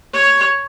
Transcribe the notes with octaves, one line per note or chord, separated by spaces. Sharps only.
C#5